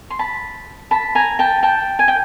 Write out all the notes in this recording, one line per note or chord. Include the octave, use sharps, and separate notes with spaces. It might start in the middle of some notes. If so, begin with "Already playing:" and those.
C6
A5 B5
A5 B5
G#5 A#5
G5 A5
G5 A5
G#5
G5